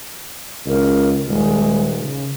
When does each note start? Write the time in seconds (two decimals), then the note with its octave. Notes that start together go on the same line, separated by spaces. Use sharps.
0.66 C#2 A#4
1.28 D#1 G#3
1.99 C#3